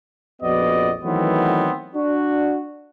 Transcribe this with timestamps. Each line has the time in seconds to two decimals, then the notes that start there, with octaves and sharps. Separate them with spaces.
0.42 A#1 F2 B3 F#4 D5 D#5
1.04 D#3 E3 F#3 A3 B3 C4
1.95 D4 F#4